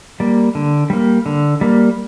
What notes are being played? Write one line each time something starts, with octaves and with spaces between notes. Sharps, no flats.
G3 A#3
D3
G3 A#3
D3
G3 A#3